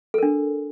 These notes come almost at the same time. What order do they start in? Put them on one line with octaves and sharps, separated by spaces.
A4 A#4 D4